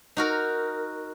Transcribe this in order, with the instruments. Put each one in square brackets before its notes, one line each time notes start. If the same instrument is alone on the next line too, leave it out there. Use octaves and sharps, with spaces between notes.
[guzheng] D#4 F#4 A#4